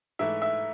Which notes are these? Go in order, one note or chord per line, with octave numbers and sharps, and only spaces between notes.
G#2 E3 A3 E5
E5